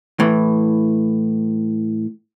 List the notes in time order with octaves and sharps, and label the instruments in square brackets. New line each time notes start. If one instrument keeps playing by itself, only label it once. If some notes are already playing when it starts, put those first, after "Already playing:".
[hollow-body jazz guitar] A2 E3